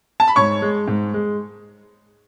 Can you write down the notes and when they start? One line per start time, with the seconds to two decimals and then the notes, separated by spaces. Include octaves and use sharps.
0.20 A5
0.28 B5
0.36 G#2 C#5 C#6
0.62 G#3
0.88 G#2
1.14 G#3